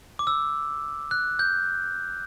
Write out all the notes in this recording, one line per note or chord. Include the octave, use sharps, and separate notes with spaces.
D6
E6
F#6
G6